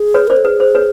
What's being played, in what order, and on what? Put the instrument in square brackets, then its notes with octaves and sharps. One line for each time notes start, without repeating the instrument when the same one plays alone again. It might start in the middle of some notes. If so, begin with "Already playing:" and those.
Already playing: [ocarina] G#4
[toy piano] B4 C#5
[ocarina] A#4 [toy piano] C5 D5
[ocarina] A4
[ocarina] G#4 [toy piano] B4
[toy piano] C5
B4 C#5